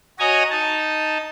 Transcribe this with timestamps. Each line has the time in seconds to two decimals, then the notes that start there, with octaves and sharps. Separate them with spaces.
0.19 F#4 C#5 D#5 G#5 A#5
0.51 D#4 A5